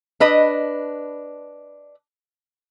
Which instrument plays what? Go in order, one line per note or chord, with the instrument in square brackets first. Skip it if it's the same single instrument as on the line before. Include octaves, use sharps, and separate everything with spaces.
[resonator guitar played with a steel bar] D4 B4 D#5